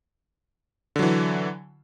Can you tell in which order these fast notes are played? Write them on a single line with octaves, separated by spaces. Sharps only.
D3 F#3 E3